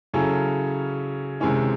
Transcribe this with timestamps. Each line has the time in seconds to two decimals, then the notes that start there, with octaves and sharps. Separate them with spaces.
0.13 C#3 F#3 C#4 E4 A4
1.40 C3 D#3 G#3 C#4 E4